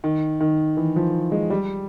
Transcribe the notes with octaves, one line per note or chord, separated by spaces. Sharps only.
D#3
D#3
E3
F3
G#3
G3